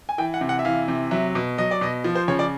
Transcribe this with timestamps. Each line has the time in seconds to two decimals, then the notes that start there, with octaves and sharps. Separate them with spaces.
0.09 G#5
0.18 E3 G5
0.34 F#5
0.41 C3
0.49 F#5
0.59 E5
0.65 E3 F5
0.88 C3
1.11 F#3 E5
1.35 B2
1.58 F#3 D#5
1.71 D5
1.81 B2 D#5
2.04 F3
2.15 C5
2.28 C#3 C#5
2.39 D5